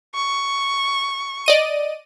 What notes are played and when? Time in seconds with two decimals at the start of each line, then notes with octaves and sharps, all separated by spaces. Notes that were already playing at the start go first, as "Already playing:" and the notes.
0.15 C#6
1.46 D5 D#5 D#7